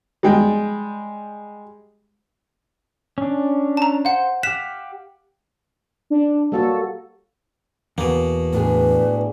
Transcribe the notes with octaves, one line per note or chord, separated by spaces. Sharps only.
G3 G#3 G5
C#4 D4
A5 A#5
C5 F5 F#5
G4 F5 F#5 B6 E7
D4
G3 A#3 F#4 A4
E2 B2 A#3
A2 D4 G#4 B4